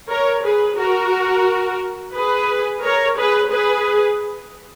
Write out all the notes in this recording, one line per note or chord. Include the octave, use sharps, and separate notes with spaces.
A#4 C#5
G#4 B4
F#4 A#4
G#4 B4
A#4 C#5
G#4 B4
G#4 B4